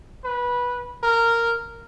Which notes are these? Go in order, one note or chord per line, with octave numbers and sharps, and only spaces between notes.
B4
A#4